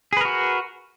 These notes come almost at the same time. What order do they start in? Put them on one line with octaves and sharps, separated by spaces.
G#4 B4 A#4 F#4